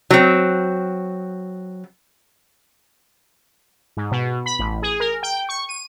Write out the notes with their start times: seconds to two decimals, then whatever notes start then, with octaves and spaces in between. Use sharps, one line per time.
0.11 F#3 C4
3.97 G#2
4.11 B2
4.46 B5
4.59 A1
4.82 G#4
5.00 A#4
5.23 G5
5.49 C#6
5.69 D#7